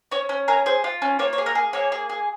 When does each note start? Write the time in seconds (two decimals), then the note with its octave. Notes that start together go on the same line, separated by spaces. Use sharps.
0.12 C#4 C#5
0.29 C#4
0.48 G#4 A#4
0.66 G#4 C5
0.84 F4
1.02 C#4
1.19 A#3 C#5
1.33 C#5
1.38 G#4
1.46 A#4
1.55 G#4
1.73 A#3 C#5
1.92 G#4
2.10 G#4